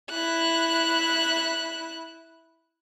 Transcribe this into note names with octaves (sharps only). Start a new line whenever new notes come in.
E4 F#6